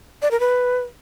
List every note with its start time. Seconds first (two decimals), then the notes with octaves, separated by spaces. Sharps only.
0.22 D5
0.31 A#4
0.40 B4